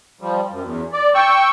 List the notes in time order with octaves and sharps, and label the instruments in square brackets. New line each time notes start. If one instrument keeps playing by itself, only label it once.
[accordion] F3 G3
F#2
E2
D5
G5 C#6 E6